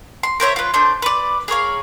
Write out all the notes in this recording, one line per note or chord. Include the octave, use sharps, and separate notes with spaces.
C6
A#4 C5 C#5 E5
F4 B4
A3 D4 C5
B4 D5
G#4 A#4 C#5 F5